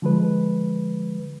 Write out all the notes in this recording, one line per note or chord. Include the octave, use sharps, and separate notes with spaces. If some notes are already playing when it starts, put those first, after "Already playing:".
D3 F3 G#3 B4